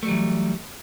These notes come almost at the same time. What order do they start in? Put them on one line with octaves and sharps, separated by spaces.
A3 G3 F#3 E3